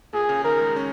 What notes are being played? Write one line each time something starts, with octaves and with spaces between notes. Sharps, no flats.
A#2 G#4
C#3
D#3 A#4
G#3
C#4